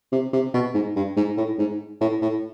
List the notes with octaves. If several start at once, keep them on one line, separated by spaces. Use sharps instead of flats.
C3
C3
B2
G#2
G2
G#2
A2
G#2
A2
A2